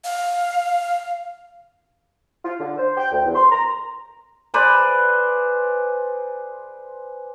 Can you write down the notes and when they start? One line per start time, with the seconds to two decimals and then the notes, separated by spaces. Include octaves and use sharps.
0.05 F5
2.44 F4
2.59 D3
2.77 C5
2.97 G5
3.11 D2
3.23 E2
3.35 C6
3.52 A#5
4.54 G#4 B4 C5 D5